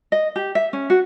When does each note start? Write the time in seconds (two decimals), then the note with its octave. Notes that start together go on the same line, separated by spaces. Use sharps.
0.12 D#5
0.36 G4
0.55 E5
0.73 C#4
0.90 F#4